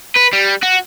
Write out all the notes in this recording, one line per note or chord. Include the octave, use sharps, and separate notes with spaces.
B4
G3
F#4